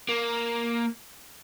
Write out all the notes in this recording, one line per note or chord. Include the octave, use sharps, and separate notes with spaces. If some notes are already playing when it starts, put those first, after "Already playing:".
A#3